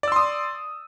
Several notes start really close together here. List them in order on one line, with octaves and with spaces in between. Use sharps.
D5 E6 C6 D#6